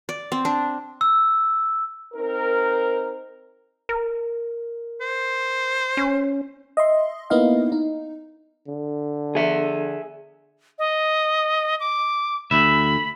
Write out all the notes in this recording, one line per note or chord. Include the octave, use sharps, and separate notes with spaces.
D5
C4
D4
E6
C4 D#4 A#4
A#4
C5
C#4
D#5 E5 C6
A#3 B3 D#4 E4 D#5 F5
D#4
D3
G#4 E5
D#5
D6
D2 E5 B5